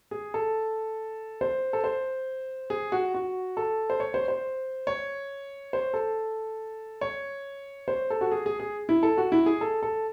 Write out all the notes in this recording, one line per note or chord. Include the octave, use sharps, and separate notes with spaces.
G#4
A4
C5
A4
C5
G#4
F#4
F#4
A4
C5
C#5
C5
C5
C#5
C5
A4
C#5
C5
A4
F#4
G#4
G#4
G#4
E4
A4
F#4
E4
G#4
A4
A4